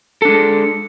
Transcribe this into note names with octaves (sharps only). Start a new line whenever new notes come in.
G#3 D4 A4